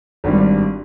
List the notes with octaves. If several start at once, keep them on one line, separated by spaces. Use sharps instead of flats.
G#1 G2 G3